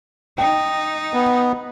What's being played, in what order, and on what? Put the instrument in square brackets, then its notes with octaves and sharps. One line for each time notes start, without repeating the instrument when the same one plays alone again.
[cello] D#4 [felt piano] G5
[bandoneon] B3